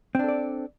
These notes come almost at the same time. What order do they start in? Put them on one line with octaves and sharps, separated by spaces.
C4 D4 A4 D5